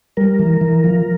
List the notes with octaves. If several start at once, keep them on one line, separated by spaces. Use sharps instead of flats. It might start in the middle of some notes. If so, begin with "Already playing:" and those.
G3 A#4
E3
E3
F3